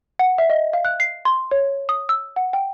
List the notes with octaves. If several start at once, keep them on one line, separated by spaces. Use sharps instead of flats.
F#5
E5
D#5
F5
F#6
C7
C6
C#5
D#6
E6
F#5
G5